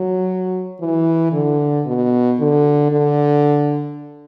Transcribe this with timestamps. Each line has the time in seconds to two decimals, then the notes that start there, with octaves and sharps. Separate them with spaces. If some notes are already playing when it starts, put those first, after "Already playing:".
Already playing: F#3
0.81 E3
1.33 D3
1.86 B2
2.39 D3
2.92 D3